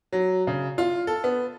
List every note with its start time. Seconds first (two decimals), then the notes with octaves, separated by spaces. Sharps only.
0.13 F#3
0.47 C#3
0.78 F4
1.07 A4
1.24 B3